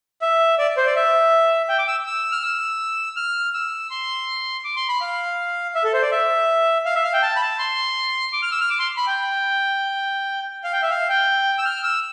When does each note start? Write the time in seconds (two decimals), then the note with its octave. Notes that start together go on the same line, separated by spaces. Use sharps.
0.22 E5
0.59 D5
0.77 C5
0.86 D5
0.96 E5
1.69 G5
1.78 D6
1.88 E6
2.06 E6
2.32 F6
2.43 E6
3.16 F6
3.54 E6
3.91 C6
4.64 D6
4.76 C6
4.89 B5
5.01 F5
5.75 E5
5.84 A4
5.94 C5
6.02 D5
6.12 E5
6.85 F5
6.95 E5
7.04 F5
7.13 G5
7.22 A5
7.36 B5
7.41 A5
7.59 C6
8.33 D6
8.42 F6
8.51 E6
8.61 F6
8.70 D6
8.79 C6
8.97 B5
9.07 G5
10.64 F5
10.73 G5
10.82 E5
10.91 F5
11.09 G5
11.58 E6
11.65 F6
11.83 E6